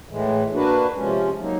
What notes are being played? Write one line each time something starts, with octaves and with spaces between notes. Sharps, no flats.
A2 E3 G#3
A#3 D4 F#4 B4
C3 F3 G#3 C#4
F#3 A#3 D#4